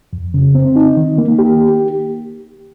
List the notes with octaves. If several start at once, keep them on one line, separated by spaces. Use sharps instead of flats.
F2
C#3
C4
D#4
D#3
A#3
G4